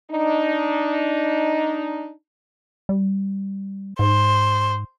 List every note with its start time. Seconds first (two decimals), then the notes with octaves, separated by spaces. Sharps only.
0.11 D4 D#4
2.89 G3
3.99 G#2 C5